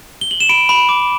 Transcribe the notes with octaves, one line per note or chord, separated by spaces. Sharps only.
G7
F#7
E7
B5 D7
B5
D6